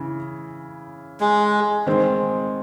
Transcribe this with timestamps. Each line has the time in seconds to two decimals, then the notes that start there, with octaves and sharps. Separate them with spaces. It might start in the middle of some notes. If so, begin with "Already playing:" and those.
Already playing: C#3 E3
1.20 G#3
1.86 D#3 G#3 C4